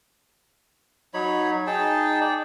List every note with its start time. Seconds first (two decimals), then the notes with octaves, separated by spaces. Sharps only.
1.14 F#3 D#4 C#5 B5
1.67 D#4 G#4 G5 A5
2.21 D5 G5